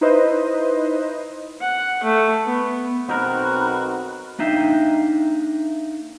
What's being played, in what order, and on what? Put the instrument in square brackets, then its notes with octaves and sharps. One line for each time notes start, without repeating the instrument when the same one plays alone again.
[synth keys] D#4 E4 B4 C5 D#5
[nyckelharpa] F#5
A3
B3
[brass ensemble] B1 C4 [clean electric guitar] D#4 A#4 [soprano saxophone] F#4 [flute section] A#5 B5 F#6
[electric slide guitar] A#3 D4 D#4 E5 F5 G5